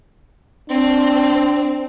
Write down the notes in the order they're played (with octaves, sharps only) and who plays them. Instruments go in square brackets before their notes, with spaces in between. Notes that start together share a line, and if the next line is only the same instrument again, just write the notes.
[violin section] C4 [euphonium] D4